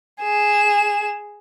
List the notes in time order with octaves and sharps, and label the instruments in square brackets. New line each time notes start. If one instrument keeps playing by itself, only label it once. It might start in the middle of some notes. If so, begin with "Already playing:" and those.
[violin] G#4 E7